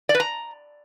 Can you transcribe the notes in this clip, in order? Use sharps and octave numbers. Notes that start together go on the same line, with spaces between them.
D5
B4
A#5